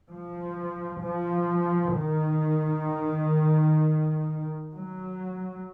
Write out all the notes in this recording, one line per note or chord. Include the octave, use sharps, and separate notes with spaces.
F3
F3
D#3
F#3